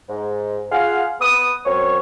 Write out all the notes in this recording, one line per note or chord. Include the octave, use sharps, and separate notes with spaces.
G#2
F4 G#4 F5 F#5
B3 B4 D#6
F#2 C4 C#5